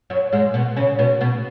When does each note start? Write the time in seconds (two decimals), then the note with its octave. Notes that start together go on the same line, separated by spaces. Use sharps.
0.10 F#2 F#3
0.32 G#2 G#3
0.54 B2 B3
0.76 C#3 C#4
0.99 B2 B3
1.21 B2 B3